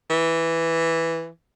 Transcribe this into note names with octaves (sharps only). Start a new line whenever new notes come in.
E3